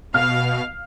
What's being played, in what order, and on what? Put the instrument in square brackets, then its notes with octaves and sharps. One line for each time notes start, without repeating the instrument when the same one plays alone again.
[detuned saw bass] B2 [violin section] F5 [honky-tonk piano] F6